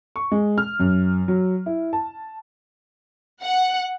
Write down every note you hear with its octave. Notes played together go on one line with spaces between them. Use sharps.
C#6
G#3
F6
F#2
F#3
E4
A5
F#5